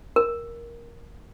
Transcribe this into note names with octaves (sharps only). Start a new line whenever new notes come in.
A#4